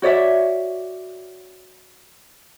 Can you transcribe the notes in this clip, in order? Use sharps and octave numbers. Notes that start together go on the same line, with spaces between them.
F#4 C#5 D5 E5